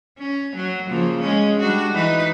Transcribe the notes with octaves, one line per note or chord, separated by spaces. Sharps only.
C#4
F#3
C#3 F3 A#3
G#3 C#4
G3 D4 F#4
E3 D#4 B4